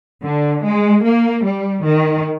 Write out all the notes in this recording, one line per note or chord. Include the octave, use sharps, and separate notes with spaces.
D3
G#3
A#3
G3
D#3